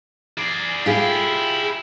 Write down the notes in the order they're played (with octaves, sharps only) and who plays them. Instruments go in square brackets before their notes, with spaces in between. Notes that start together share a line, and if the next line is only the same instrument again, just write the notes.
[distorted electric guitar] G#4 D5
[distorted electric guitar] E4 G4 [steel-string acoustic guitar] F4 G#4